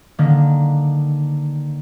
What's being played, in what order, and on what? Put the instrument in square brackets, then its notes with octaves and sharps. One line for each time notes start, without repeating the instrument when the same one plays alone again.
[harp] D3 D#3 A#3